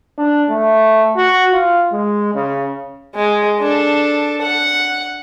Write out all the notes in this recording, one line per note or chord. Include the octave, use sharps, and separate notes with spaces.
D4
A3
F#4
F4
G#3
C#3
G#3
D4 A4
F#5